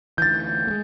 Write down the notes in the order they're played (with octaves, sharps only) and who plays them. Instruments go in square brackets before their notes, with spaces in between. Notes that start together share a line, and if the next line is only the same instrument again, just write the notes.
[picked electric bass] D2 E3 [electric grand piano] G6 A6
[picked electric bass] G#3 A3